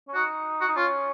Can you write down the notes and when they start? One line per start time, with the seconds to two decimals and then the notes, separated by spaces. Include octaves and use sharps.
0.08 C#4
0.14 D#4 F#4
0.61 F#4
0.68 D#4
0.76 C#4 F4